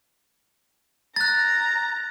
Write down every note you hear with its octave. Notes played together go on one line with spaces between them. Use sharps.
A#5 F#6 A6